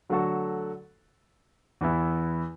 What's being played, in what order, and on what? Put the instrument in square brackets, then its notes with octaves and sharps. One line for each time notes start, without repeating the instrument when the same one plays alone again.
[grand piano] D3 F#3 A3 F#4 A4
E2 E3 B3 E4